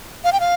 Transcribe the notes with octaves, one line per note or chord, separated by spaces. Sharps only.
F5
G5
F5